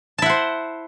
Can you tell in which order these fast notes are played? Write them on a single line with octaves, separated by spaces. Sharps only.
A5 E4 F#5 C5